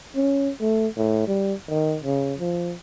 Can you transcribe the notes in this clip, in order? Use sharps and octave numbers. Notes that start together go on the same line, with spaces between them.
C#4
A3
A2
G3
D#3
C#3
F3